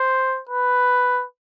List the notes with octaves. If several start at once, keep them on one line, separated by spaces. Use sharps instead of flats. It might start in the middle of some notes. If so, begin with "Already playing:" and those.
Already playing: C5
B4